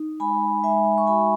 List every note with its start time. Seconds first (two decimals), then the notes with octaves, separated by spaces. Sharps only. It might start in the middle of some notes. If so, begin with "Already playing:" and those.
Already playing: D#4
0.20 G#3 G#5 B5
0.64 G#3 E5 G#5
0.98 C#6
1.07 F#4 G#5 B5